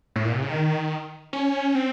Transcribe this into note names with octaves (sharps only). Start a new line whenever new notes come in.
A2
A#2
C3
C#3
D#3
C#4
C4